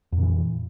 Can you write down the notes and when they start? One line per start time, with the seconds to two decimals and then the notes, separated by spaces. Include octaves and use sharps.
0.12 F2
0.17 A#2
0.22 E3